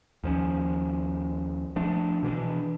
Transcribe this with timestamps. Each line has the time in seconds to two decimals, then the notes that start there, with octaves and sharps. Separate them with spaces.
0.24 D#2 F3 C#4
1.76 F3 A3 D4
2.23 B2 E3 D4